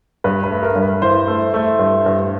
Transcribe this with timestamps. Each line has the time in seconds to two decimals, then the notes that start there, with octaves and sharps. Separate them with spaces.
0.24 G2 B4
0.43 B4
0.50 A3
0.63 A#4
0.76 G2
0.82 B4
1.02 E3 C5
1.28 A3
1.54 A3
1.79 G2
2.06 G2